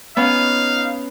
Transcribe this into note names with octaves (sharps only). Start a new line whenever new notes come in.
B3 C#4 D#4 F5